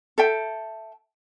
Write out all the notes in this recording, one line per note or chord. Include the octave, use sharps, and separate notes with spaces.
A4 E5 G5